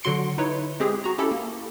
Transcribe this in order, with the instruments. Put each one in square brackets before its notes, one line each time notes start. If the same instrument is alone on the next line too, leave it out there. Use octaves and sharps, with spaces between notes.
[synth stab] D3 F#3 F#4 C6 C#7 D7
D#4 E4 B4 C#5
G#3 C4 G4 G#4
F#4 A#5
C#4 E4 G4 A4
A#3